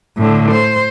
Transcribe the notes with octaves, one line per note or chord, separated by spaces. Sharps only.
A2 D3
C5